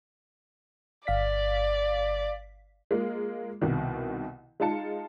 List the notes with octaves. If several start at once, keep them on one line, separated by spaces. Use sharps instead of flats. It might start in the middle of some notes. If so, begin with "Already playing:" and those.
G1 D5 F5 B6
G#3 A#3 F4
C2 B2 D#3
G#3 D#4 F4 A5 C#7